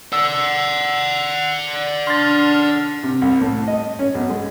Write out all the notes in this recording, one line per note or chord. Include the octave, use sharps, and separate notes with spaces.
D5 F#5 E6
D4 C6 F6 A6
C3
C2
A2
D#5
C#4
B1
G#3